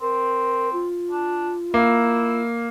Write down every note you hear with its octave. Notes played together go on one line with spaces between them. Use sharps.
C4 A#4
F4
D4
A#3 E4